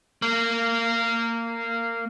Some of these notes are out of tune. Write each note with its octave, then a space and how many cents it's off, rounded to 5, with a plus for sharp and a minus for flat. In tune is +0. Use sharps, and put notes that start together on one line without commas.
A#3 -20